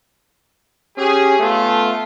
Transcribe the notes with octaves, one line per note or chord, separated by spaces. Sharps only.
C#4 G4 G#4
A3 B3 F4 A4